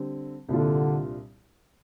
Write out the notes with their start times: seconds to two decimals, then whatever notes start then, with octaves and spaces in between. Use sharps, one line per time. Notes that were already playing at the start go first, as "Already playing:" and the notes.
Already playing: D3 G3 C4
0.49 C2 A#2 D3 G3 D4 F4